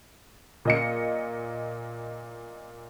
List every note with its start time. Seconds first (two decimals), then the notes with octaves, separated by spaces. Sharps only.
0.65 A#2 D#5 C#7